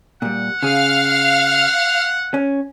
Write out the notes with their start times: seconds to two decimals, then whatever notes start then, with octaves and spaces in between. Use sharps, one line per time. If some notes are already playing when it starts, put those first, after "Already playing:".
0.22 A#2 G3 F#5
0.63 C#3 G#4 F5 F6
2.34 C#4